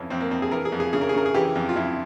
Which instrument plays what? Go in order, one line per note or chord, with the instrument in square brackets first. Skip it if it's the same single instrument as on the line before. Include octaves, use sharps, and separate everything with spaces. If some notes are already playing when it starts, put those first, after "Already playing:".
Already playing: [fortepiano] F2 E3 C#4 E4
F2 C4
A#3
F2 C4
G#4
E3 A#4
G#4
F2
G#4
C#3 G#4
A#4
G#4
C#3 A#4
G#4
E3 G4
F2
F4
F2 E4